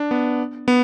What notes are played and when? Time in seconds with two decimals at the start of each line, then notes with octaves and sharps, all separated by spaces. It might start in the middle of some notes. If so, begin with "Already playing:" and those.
Already playing: D4
0.11 B3
0.68 B3